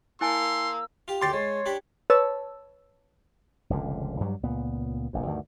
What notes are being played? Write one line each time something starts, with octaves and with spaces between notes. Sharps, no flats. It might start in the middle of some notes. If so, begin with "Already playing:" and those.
A#3 E4 G#5 A5 C6 E6
F4 G4
D2 G4 C#5 G5 C6 A6 C7
G#3 C#5
D4 G4 B5
B4 C#5 A5 E6
F1 C#2 A#2 D3
G2 F#3 G3
C#2 A#2 B3
F1 A#1 F#2
D2 G2 D#3